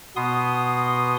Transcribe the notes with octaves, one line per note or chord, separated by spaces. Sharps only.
B2 B3 C6 D#6